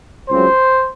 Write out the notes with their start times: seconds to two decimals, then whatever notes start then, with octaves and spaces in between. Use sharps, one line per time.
0.29 C#2 C#3 F#3 C4 C5